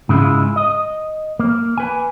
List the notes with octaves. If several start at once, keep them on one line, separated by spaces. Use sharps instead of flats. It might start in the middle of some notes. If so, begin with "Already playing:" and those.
G#2 C#3 G#3 E4 F4
D#5
A#3
B4 G#5